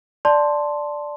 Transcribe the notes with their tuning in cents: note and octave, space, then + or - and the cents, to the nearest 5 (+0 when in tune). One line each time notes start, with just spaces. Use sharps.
D5 +0 A5 +0 C6 +0